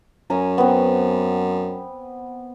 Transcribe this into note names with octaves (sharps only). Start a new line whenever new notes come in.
F#2 C#4 G#5 A#5
B3 C4